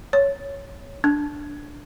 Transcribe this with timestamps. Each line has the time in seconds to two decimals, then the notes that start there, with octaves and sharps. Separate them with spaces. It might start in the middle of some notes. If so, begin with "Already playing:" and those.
0.13 C#5
1.04 D4